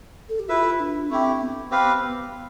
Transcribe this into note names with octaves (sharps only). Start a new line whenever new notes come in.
A4
G4
E4 F4 B4 E5
D4
A3 C4 E4 G4
B3
C4 G4 B4 F5